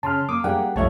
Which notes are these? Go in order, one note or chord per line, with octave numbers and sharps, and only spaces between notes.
C#3 A5 C6 F6
A#3 D6 D#6
G3 A#3 D4 G#4 F#5 G5
B1 G2 F3 A3 F4 C#5 E5 A5